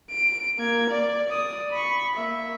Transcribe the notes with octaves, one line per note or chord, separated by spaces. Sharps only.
D7
A#3 G#6
D5
D5 D#6
B5 C#6
A#3 E5